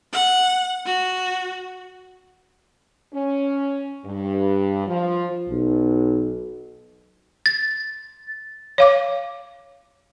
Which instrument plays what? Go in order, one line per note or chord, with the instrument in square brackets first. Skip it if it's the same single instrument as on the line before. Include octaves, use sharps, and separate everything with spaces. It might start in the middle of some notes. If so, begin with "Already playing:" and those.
[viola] F#5
F#4
[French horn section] C#4
G2
F3
[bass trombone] B1
[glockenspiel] A6
[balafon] C#5 F5 D6